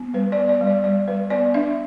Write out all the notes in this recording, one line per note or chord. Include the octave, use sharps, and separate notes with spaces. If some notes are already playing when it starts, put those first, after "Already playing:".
Already playing: B3
G3 B4
D5
B3
D5
G3
D5
G3 D5
G3 B4
B3 D5
D4 E5